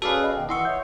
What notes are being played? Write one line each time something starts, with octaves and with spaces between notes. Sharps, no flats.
C#4 F#4 G#4 A4 B4 D5 F5
D#5
B2 D#3 B3 G5
E3 E4 D#5 F#5 C6 C#6 E6
C#5 E5 G6